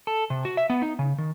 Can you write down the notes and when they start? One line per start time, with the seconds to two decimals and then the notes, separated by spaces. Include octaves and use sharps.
0.07 A4
0.30 C3
0.45 F#4
0.57 E5
0.70 B3
0.82 D#4
0.99 C#3
1.18 D#3